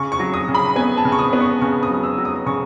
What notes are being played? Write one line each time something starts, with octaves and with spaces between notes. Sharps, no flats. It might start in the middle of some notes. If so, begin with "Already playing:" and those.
Already playing: C#3 C#6
C#6
F#3
D#6
C#3
B5
B3 G#5
A5
C#3
C#6
D#6
B3
C#6
C#3 C#6
D#6
F#3
E6
F#3
D#6
C#3 C#6